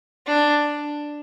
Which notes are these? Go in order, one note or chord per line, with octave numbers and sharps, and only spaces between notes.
D4